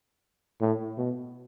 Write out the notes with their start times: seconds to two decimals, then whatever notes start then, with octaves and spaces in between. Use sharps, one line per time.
0.61 A2
0.98 B2